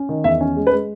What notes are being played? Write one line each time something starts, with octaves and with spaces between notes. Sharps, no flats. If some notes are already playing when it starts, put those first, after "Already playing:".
Already playing: C#4
D#3
E2 E5
C#4
G#3
B4
G#3